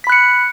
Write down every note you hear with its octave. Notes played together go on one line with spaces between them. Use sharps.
B5 F#6 B6 C#7